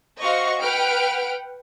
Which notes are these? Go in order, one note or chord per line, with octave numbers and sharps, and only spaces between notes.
F#4 C5 D#5 F5 C#6 C#7
B4 F#5 G5 F6 D7